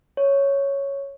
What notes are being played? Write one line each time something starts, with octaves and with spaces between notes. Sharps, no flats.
C#5